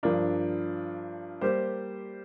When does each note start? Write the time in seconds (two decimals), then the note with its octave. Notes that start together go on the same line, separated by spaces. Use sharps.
0.03 G2 F3 D4 A#4
1.41 G3 A#3 G4 C5